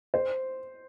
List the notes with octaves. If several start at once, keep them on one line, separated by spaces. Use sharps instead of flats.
C5